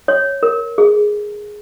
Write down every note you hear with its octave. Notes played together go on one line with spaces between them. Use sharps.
C#5
A#4
G#4